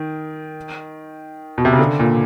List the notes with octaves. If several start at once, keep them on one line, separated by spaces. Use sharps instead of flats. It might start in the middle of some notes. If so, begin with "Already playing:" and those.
Already playing: D#3
B2
C3
C#3
D3
A#2